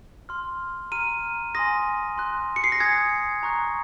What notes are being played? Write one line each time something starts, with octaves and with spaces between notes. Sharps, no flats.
C6 F6
A#5 F6 D#7
G#5 C6 D#6 A#6
C6 F#6
C#7
C7
A#6
G#5 D#6 F#6 G#6
A#5 C#6 F#6